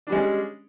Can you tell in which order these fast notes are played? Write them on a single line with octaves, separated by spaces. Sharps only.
D4 G3 G#3 C#4